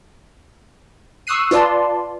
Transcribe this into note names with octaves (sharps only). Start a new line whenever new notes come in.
C#6 D#6 E6 F#6 C7 D#7
F4 B4 D5 A5 C6